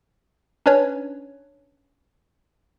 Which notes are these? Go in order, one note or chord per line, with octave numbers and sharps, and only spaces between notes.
C#4 D4 B4 C#5